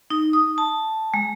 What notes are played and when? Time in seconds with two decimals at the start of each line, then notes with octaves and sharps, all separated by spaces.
0.10 D#4
0.33 D#6
0.58 A5
1.14 G#3